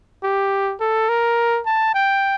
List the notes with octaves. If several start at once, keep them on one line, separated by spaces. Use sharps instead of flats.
G4
A4
A#4
A5
G5